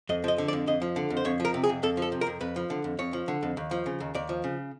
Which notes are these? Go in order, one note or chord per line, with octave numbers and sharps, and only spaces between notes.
F2 D#5
F3 D#5
D3
D5
F2
F2 D#5
F3
D3
F2
C5
F2 C#5
F3 A#4
C3
G#4
F2
F2 A4
F3 A4
C3
A#4
F2
F2 B4
F3
D3
F2
F2 C#5
F3
D3
F2
D#2
F3
C#3
D#2
D#2 D5
F3
C#3